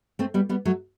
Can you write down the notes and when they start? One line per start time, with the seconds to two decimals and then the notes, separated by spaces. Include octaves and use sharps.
0.19 A3 C4
0.34 G3 B3
0.49 G3 B3
0.65 F#3 A3